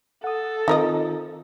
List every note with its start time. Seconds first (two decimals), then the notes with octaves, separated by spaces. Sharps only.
0.24 A4 F#5 D#6
0.68 D#3 C4 D#4 F4 A#4 D#5